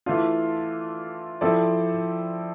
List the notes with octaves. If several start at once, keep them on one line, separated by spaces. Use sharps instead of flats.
E3 A3 D4 F4
F3 C4 E4 A4 D5